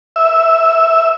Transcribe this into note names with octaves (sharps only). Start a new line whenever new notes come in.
E5